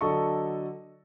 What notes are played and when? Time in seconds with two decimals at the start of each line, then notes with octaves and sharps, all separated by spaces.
0.01 D3 F#3 A4 D#5 A5 C#6